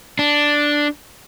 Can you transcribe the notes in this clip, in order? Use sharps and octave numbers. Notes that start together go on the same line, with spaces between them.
D4